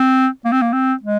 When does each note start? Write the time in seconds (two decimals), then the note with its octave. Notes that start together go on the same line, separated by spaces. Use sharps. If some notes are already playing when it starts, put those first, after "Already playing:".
Already playing: C4
0.45 A#3
0.52 C4
0.62 A#3
0.73 C4
1.03 G#3